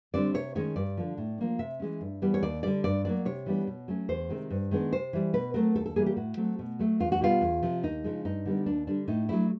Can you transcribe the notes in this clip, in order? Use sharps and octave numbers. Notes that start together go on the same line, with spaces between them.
D3 G3 C4 D5
C3 C#5
D#3 G#3 C#4 C#5
G2 D5
D3 F3
A2
F3 A#3 D4
C3 E5
E3 G#3 C#4
G2
E3 G3 B3
C#5
D#2 D5
D3 G3 D5
G2 D5
D3 F#3 A#3 D5
C3 C#5
E3 G3 B3 D4
B2
F#3 A3 C#4
E2 C5
C3 D#3 G#3 C4
G2
D#3 G#3 B3 D4
C3 C5
E3 G3
B2 B4
F#3 A3 C4 A#4
D#2 A4
A4
C#3 E3 G3 A#3 G#4
G4
A2 F#4
F#3 A3 C4
B2
F#3 A3
E2 F4
F#4
B2 G3 B3 F4
E2
C3 F3
D#2 D#4
C#3 F3 G#3
G2 D#4
D3 G3 B3
D#2 D4
D3 G3 D4
A2 D#4
F#3 A3 D4 E4